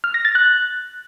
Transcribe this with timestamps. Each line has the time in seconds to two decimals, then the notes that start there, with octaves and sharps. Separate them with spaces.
0.04 F6
0.14 A#6
0.25 A6
0.35 F#6